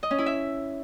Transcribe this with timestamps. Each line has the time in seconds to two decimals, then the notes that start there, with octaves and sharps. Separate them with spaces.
0.03 D#5
0.11 C#4
0.18 E4
0.26 E5